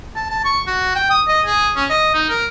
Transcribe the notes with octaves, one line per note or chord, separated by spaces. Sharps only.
A5
A5
C#6
F#4
G5
D#6
D#5
G#4
C#4
D#5
D#4
A#4